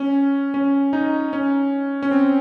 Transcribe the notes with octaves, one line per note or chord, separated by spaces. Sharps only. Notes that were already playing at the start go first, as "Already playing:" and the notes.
Already playing: C#4
C#4
D#4
C#4
C#4
C4